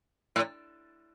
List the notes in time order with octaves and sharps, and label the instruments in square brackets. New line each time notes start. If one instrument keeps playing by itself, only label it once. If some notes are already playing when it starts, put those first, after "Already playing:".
[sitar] A2